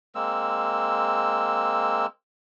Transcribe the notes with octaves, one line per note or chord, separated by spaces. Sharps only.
G#3 A#3 C4 E6